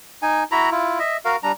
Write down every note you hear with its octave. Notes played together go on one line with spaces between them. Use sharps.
D#4 G#5
E4 F#4 A#5 B5
E4 F4
D#5 E5
F#4 A#4 F5
G3 D4 A#5